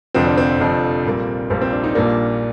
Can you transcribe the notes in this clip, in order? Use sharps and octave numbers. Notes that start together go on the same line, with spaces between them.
F1 F2 D3 F3 C4
D4
C4
F1 F2 D3 F3
A#1 A#2 G3 A#3
A#1 A#2 G3 A#3 C4
C4
D4
D#4
A#1 A#2 G3 A#3 D4